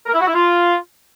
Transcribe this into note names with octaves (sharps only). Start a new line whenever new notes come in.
A#4
E4
F#4
E4
F4